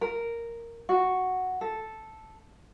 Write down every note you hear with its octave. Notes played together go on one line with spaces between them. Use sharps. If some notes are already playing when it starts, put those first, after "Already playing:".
A#4
F#4
A4